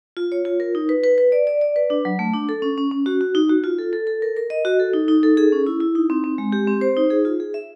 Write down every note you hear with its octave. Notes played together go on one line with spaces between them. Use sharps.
F4
C#5
F4
A#4
D#4
B4
B4
B4
D5
D5
D5
B4
D4
F#3
A3
D4
A4
C#4
C#4
C#4
F#4
F#4
D#4
F#4
F4
A4
A4
A4
A#4
A#4
D#5
F#4
A4
D#4
D#4
A4
G#4
C#4
E4
E4
D#4
C4
C4
G#3
G4
C4
C5
D#4
G#4
F4
G#4
E5